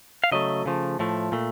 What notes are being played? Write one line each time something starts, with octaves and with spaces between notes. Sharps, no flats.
F5
C#3 F#3 A3 D#5
C#3 F3 A3
A2 F3 A3
A#2 A3